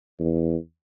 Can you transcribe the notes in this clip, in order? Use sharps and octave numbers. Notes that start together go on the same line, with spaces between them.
E2